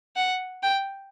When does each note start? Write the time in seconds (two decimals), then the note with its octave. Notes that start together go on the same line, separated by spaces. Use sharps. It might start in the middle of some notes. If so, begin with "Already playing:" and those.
0.16 F#5
0.63 G5